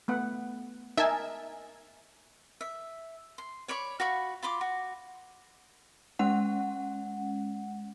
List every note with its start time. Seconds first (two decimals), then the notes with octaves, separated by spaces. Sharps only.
0.08 A3 B3 F#5
0.97 D#4 A#4 E5 G#5 A5
2.61 E5
3.38 C6
3.68 C#5 D5 B5 C#6
4.00 F#4 F5 B5 C#6
4.43 F4 B5 C6 D6
4.61 F#4
6.19 G#3 C#4 F#5